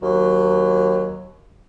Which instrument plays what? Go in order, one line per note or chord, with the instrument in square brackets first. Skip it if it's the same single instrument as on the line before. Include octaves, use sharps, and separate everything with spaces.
[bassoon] D#2 [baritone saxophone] F#3